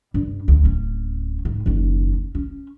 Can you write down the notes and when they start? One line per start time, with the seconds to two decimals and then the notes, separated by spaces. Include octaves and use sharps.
0.14 G2
0.48 D2
0.64 D1 C#4
1.45 G#2
1.66 F#1 D#2
2.35 C#4